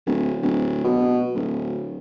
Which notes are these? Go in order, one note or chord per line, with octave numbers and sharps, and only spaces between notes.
D1
D1
B2
D1